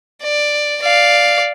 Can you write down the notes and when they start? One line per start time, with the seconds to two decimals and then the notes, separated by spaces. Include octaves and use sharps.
0.23 D5
0.83 D5 F5